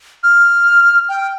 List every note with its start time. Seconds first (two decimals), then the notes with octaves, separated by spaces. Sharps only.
0.23 F6
1.09 G5